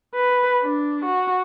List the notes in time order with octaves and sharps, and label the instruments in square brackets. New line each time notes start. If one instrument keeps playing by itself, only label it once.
[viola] B4
D4
F#4